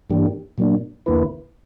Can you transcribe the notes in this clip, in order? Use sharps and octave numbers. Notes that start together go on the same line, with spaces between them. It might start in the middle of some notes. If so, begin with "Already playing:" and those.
G2 E3 A#3 D4 G4
A#2 F#3 A#3 D4
E2 D3 A#3 E4 B4